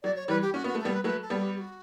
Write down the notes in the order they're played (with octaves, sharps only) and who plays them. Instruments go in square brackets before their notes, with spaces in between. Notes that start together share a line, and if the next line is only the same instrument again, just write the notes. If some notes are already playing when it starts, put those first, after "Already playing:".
[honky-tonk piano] F#3 [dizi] D5
[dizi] C#5
[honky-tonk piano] E3 G3 [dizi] B4
[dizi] G4
[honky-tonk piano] C#4 [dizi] F#4
[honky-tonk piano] B3 [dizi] F#4
[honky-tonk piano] A3
[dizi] A4
[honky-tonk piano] G3 B3
[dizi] B4
[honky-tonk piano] F#3 A3 [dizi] B4
[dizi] A4
[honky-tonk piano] G3 B3
[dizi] G4
G4
F#4